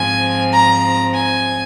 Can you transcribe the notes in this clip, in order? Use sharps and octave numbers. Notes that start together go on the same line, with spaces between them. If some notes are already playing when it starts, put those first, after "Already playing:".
Already playing: G#2 F3 C4 G#5
A#5
G#5